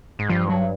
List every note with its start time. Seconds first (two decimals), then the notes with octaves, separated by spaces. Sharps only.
0.19 G#2
0.29 G2 F3
0.49 F#3